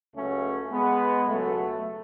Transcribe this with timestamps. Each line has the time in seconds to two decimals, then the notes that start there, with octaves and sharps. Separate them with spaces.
0.15 C#2 C#3 F#3 A3 C#4
0.71 G#3 B3
1.27 C#2 B2 F#3 A3